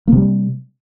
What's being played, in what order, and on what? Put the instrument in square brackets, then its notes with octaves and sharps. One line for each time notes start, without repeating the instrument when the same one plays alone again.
[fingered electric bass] A#3
C3
G3